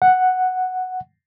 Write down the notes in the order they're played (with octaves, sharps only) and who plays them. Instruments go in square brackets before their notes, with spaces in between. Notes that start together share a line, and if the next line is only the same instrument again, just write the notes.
[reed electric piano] F#5